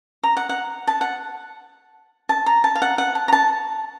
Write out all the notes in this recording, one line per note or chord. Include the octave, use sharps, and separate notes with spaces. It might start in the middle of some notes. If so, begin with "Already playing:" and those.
A#5
F#5
F#5
A5
F#5
A5
A#5
A5
F5
F#5
F#5
A5
A#5
A5